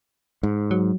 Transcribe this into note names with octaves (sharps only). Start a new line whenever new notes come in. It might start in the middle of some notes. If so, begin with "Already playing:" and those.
G#2
F#3